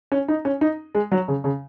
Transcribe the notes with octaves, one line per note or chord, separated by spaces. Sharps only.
C#4
D#4
C#4
D#4
G#3
F#3
C#3
C#3